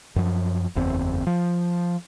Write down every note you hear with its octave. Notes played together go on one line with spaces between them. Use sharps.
F#2 F3
F#1 E2 C4
F3